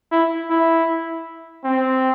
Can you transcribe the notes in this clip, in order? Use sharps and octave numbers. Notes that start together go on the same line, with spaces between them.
E4
E4
C4